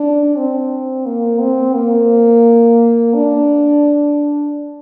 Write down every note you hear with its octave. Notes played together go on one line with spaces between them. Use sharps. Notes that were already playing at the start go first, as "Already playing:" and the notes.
Already playing: D4
C4
A#3
C4
A#3
D4